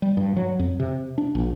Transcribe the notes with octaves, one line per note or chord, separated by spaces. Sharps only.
G3
G2
F#3
F2
C3
D4
A#1